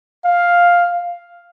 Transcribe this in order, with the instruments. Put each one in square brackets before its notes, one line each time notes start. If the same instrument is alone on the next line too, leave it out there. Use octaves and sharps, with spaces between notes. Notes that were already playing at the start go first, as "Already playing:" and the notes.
[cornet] F5